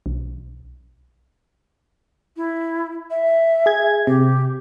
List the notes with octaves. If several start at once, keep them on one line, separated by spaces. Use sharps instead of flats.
B1
E4
E5
G#4 G#6
C3 G4